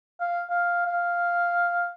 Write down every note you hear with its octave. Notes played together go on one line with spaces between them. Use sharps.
F5
F5
F5